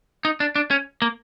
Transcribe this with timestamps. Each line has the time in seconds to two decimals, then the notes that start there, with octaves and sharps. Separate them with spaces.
0.25 D#4
0.40 D4
0.56 D4
0.71 C#4
1.02 A#3